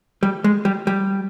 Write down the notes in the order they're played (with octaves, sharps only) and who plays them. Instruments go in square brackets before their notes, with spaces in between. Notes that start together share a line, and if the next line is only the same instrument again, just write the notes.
[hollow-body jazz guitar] G3
G#3
G3
G3